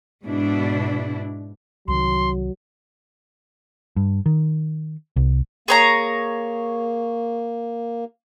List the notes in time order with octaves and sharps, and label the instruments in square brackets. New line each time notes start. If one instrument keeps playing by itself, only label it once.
[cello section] G#2 B2 D4 E4
[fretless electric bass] C2 D#3 [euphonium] F#3 [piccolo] C6
[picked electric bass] G2
D#3
C2
[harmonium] A#3 [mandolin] G#4 C#5 A#5